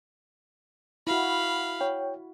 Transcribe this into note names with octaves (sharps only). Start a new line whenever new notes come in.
E4 F#4 F5 B5
C#5 G5